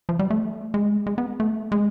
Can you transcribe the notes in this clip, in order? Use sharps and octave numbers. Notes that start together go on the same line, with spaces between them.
F3
G3
A3
G#3
G#3
B3
A3
G#3